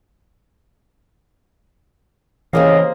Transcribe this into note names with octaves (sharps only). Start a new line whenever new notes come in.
C#3 E3 G3 A#3 C4 D#5 F5